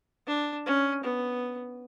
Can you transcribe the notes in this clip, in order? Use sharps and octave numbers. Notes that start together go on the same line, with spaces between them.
D4
C#4
B3